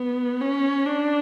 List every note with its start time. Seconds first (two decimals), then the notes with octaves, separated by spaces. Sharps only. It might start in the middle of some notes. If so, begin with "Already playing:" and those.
Already playing: B3
0.41 C#4
0.85 D4